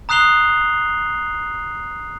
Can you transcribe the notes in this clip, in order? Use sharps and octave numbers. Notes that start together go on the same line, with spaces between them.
A#5 D#6 F#6 C7 F7 G7